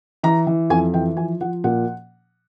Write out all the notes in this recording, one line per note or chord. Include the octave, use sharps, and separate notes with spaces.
E3 A#5
E3
F2 G#5
E3 G5
F3 G#5
F3 F#5
A#2 F#5